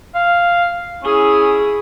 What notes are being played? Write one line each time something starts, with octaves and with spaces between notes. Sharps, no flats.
F5
C#4 E4 G#4